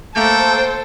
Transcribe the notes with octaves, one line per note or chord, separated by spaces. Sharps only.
A3 A#3 A4 C5 G5